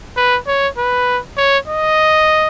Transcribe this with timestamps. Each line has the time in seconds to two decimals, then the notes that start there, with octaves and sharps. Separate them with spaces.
0.16 B4
0.47 C#5
0.78 B4
1.37 C#5
1.68 D#5